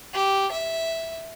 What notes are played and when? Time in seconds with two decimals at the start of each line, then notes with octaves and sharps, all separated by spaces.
0.14 G4
0.52 E5